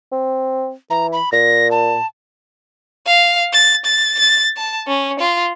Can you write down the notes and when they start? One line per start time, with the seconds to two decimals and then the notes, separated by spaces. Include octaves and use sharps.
0.12 C4
0.90 E3 A#5
1.13 B5
1.32 A#2 A#6
1.71 A5
3.07 F5
3.53 A6
3.85 A6
4.19 A6
4.57 A5
4.87 C#4
5.19 F4